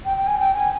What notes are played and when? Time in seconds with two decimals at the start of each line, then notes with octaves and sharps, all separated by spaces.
0.05 G5
0.17 G5
0.27 G#5
0.39 G5
0.55 G#5